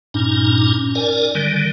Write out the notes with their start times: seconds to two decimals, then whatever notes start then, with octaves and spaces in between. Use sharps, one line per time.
0.14 G2 A#2 C#4 D#4
0.95 A#4 D5 G#5
1.35 D3 D#3 G3